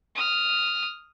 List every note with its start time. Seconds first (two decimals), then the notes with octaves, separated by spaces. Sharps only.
0.15 D#6 F6